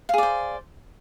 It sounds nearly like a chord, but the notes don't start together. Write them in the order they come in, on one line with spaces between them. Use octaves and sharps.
F5 G#4 D5 C5